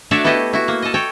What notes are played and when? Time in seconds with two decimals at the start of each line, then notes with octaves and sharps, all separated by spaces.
0.11 A3 D4 F#4 C#5 D5 E5
0.24 B3 E4 G4 A4 D#5
0.53 E4 F#4
0.68 A#3
0.82 A4 D#5
0.94 A4 C#5 G5